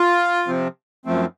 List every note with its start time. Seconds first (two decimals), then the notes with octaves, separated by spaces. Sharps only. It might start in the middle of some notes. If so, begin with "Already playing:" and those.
Already playing: F4
0.48 C3 F3 C4
1.05 F#2 F3 A3 C4